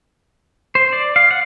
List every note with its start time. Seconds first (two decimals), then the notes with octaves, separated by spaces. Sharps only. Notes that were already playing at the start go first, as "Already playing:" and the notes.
0.75 C5
0.93 D5
1.16 F5
1.31 F#5